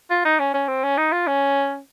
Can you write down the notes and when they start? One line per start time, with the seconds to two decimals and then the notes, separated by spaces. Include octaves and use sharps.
0.10 F4
0.25 D#4
0.39 C#4
0.54 C#4
0.68 C4
0.83 C#4
0.98 D#4
1.12 F4
1.27 C#4